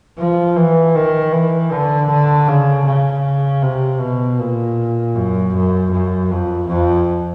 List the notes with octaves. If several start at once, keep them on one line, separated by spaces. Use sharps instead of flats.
F3
E3
D#3
E3
D3
D3
C#3
C#3
C3
B2
A#2
F#2
F#2
F#2
F2
F2